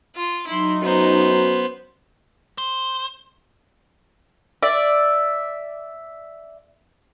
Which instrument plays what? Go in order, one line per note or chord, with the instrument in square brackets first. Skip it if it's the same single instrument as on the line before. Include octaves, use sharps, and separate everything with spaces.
[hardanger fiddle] F4
[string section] F#3 D#4 [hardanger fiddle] E4 C6
[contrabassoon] F#2 [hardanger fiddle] B3 C5
[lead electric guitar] C5
[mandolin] D5 E5